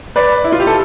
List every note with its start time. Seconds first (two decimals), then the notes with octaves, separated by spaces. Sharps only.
0.16 B4 D5
0.44 E4
0.52 F4
0.60 G4
0.67 A4